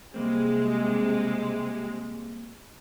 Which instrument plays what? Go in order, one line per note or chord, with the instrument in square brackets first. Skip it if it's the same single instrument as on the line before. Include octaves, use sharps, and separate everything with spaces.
[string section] C3 G#3 [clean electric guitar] G3 A#3 C4